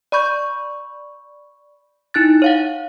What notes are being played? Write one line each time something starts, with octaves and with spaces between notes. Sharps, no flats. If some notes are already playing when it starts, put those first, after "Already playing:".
D5 B5 C#6 G6
D#4 E4 F#6 A6
C#5 F5 F#5